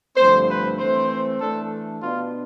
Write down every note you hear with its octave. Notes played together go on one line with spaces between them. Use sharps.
G2 D3 F3 A3 C4 C5
B4
E3 A3 C4 C5
E3 A3 D4 A4
B2 B3 D4 F4